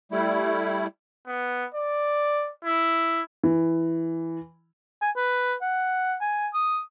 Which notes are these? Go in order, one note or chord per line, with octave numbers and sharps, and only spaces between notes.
G3 A3 E4
B3
D5
E4
E3
G#5
B4
F#5
G#5
D#6